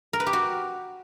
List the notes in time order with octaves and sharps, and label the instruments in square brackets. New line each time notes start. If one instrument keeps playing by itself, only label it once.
[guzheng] A#4
B4
G4
F#4